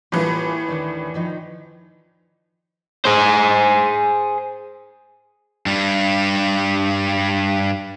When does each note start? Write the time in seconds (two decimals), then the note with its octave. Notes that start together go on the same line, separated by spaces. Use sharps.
0.12 A2 E3 G3 A#3 F4
0.68 D#2 D#3 D4
1.14 D#3 F3 D#4
3.05 G#4 C5
5.66 G2 G3